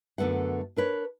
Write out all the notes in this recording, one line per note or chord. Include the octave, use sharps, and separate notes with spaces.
F#2 D3 A3 B3 F#5
D4 A#4 B4 C#5